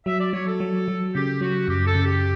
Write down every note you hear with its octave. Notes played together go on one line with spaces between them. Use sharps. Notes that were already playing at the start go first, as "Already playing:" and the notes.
F#3 E5
D5
F#3 C#5
A4
F#3
F#3
C#3 G4
F#3 F#4
F#2 G4
A4
C#3
G4